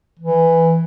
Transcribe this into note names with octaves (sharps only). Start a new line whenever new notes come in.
E3